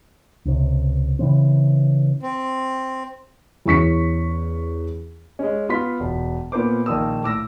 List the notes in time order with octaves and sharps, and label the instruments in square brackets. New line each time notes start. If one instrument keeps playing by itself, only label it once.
[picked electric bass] C#2 C3
C#3 E3 C4
[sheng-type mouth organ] C4
[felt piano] E2 C#4 C#6 B6 C#7
[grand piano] G#3 C#4
B3 F4 C6 B6
E1
A#2 B3 A#4 C5 D6
A#1 D#3 A#3 D#6 E6
A2 D6 E6 A#6